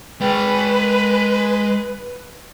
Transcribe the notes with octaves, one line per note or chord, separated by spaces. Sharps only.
G#3 B4 G5